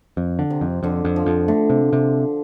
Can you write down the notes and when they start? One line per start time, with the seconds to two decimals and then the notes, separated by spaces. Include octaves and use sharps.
0.17 F2
0.39 D3
0.50 C3
0.61 F2
0.83 F2 D3
1.05 F2
1.16 F3
1.26 F2
1.48 D3 A3
1.70 C3
1.93 C3